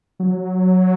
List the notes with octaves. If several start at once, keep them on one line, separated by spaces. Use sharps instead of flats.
F#3